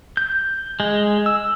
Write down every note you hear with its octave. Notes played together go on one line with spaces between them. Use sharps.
G6
G#3
E6